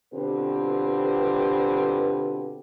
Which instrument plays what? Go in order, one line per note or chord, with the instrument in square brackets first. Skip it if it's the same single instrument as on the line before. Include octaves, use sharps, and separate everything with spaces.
[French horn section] B2 D3 C4 F4 G4 B4